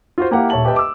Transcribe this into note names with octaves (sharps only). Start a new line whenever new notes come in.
F4 F#4 C5
A#3 E4 G4 F5 F#5
D#1 C#5 E5 A5 F#7
G4 B4 D#5 E5 G5 A5
D6 E6